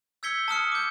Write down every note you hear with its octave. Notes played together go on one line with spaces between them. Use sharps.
E6 G6 G#6 B6 C#7 G7
A5 D#6 F6 C#7
D6 G6